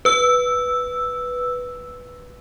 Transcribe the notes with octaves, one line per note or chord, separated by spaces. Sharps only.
B4 E6